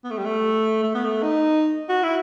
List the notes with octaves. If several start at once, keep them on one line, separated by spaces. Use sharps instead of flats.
B3
A3
G3
A3
A3
B3
A3
D#4
F#4
E4